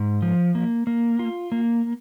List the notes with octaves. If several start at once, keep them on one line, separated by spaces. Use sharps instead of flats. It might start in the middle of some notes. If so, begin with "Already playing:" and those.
Already playing: G#2
F3
A#3
A#3
F4
A#3